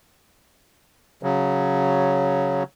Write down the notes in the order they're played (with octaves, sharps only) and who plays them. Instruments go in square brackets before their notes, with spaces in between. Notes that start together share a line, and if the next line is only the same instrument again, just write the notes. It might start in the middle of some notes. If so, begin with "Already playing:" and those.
[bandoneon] C#3 F#3